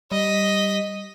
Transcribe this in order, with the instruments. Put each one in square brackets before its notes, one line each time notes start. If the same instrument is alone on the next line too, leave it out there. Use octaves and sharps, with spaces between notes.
[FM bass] G3 [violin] D#5 B6